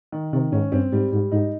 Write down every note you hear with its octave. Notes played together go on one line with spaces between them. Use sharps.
D#3
C3 D#3
G#2 C#4
G2 C4
G#2 G3
G#2 G3
G#2 D#4